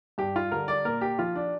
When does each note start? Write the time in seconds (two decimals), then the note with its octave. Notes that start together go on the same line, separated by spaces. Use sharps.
0.18 G2 G4
0.36 F4
0.51 D3 G3 A#4
0.68 D5
0.85 A#2 A#4
1.01 G4
1.19 F3 F4
1.35 D4